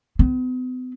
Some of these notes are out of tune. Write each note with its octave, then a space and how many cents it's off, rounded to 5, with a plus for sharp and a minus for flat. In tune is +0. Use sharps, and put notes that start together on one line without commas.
B3 +45